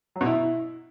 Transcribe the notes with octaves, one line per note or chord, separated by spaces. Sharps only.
F#3
B2
E4